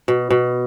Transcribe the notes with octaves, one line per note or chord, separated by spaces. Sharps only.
B2
B2